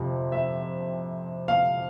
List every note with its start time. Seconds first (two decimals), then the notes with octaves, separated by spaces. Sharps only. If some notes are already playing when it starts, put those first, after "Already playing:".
Already playing: F2 C3 F3
0.32 E5
1.48 F5